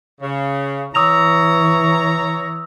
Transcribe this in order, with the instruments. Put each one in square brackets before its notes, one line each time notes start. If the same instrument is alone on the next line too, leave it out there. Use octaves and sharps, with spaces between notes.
[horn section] C#3
[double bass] E3 [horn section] C#5 A#5 [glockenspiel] D#6 E6 F7